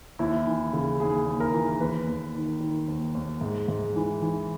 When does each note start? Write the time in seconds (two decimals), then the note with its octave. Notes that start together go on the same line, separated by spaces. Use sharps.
0.19 D#2 E4
0.47 E3
0.73 C#3
1.00 D#2 G#4
1.26 D#2
1.40 A#4
1.54 E3
1.80 D#2 B4
2.07 D#2
2.35 D#3
2.61 D#3
2.88 D#2
3.15 D#2
3.41 G#2
3.68 G#2
3.96 E3
4.22 E3